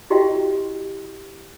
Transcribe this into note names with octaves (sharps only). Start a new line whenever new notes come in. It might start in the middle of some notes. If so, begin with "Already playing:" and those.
E4 F#4 G4 D#5 F5 G5